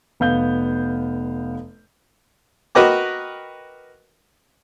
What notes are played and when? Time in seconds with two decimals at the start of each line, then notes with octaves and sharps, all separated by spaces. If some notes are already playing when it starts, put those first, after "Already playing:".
0.20 F1 B3 F5 G6 G7
2.75 F#4 A#4 B4 D#5 G5 D6